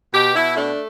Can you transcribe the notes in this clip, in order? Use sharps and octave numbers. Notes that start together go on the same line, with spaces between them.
B2 G4
B2 E4
A3 D4